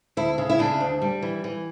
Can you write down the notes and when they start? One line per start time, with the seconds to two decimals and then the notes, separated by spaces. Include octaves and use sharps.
0.17 D2 E4
0.38 C#3
0.50 E4
0.59 C#3 D4
0.80 D2
1.02 G3
1.22 E3
1.44 E3